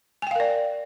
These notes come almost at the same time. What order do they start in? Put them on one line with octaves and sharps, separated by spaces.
G#5 G5 F5 A#4 D5